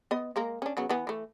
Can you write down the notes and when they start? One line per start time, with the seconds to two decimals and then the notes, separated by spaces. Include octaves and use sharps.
0.11 B3 D#5
0.36 G#3 A#3 A#4
0.62 C#4 D4
0.77 C#3 F#3 B3
0.89 E3 B3
1.07 E3 A3